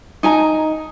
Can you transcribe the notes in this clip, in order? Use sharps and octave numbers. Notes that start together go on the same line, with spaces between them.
D#4 G#5 A#5